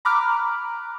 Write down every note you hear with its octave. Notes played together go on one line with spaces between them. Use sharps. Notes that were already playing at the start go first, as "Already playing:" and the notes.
A#5 B5 D6 F6 F#6